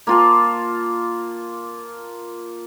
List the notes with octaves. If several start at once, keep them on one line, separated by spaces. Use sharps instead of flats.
A#3 F4 A5